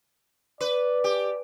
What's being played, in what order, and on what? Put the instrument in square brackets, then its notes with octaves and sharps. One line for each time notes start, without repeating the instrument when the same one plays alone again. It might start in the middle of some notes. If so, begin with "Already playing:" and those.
[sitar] B4 [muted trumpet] D5
[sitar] G4